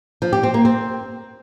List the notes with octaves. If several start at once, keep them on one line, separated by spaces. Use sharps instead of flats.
F3
G4
C4
A#3
C4